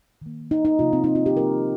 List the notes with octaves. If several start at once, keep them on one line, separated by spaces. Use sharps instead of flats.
D#3 A#3
D#4
D#4
C3 F3 A#3 F4
C4
D#4
F4
G4
C3 F3 A#3 A#4